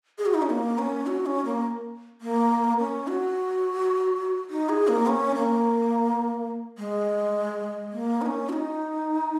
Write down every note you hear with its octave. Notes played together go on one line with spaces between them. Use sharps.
G#4
F#4
D#4
C#4
A#3
C#4
F#4
C#4
A#3
A#3
C#4
F#4
D#4
G#4
A#3
C#4
A#3
G#3
A#3
D#4
C#4
F#4
D#4